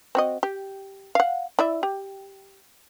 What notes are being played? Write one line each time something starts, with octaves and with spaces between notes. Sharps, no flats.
C4 F#4 D#5
G4
F5 F#5
E4 D5 E5
G4